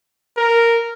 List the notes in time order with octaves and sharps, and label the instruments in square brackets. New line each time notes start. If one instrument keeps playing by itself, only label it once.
[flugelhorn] A#4